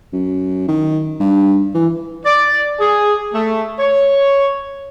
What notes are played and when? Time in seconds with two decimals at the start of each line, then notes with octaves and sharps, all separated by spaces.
0.13 F#2
0.69 D#3
1.20 G2
1.75 E3
2.26 D5
2.80 G#4
3.33 A3
3.79 C#5